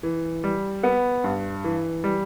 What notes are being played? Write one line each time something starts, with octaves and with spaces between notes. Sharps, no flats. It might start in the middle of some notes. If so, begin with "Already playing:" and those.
E3
G3
B3
G2
E3
G3